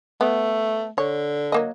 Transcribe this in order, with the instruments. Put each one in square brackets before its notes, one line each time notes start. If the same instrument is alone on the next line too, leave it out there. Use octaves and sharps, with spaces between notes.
[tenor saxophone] A3 [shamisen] B3
[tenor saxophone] D3 [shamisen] C#5
[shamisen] F#3 A#3 D#5